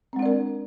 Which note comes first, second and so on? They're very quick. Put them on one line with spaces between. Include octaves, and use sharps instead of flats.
C4 G#3 D4 D5 A#4